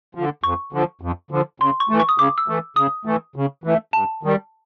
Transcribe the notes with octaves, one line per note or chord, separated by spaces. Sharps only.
D3 F3
F2 C#6
D3 F3
F2
D3 F3
C#3 C6
C#6
E3 A3
C#6
D#6
C#3 D6
E6
E3 A3
C#3 D#6
E3 A3
C#3
E3 A3
G2 A5
D#3 G3